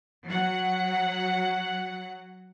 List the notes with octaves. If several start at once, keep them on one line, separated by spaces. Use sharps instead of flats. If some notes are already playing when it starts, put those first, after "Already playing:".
F#3 F#5